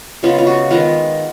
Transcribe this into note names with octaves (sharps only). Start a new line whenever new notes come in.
C#3 G#3 B3 F4
F4
F#4
D#3 G#3 B3 F4